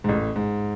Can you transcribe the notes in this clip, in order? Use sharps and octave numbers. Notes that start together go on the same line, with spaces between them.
G#2
A1 A2
G#2